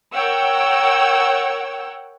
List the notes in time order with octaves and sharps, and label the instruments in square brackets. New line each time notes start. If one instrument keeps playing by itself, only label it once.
[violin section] A#4 C#5 F#5 G5 E6